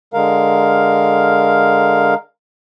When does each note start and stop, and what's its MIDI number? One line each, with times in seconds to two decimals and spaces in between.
0.14 2.14 50
0.14 2.14 56
0.14 2.14 70
0.14 2.14 77